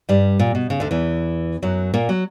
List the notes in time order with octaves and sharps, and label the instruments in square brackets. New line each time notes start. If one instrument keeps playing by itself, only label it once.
[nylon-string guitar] G2 G3
A#2
B2
C#3
D2 D3
E2 E3
F#2 F#3
A#2 A#3
F#3